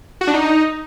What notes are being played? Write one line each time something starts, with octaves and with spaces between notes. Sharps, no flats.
F#4
D4
D#4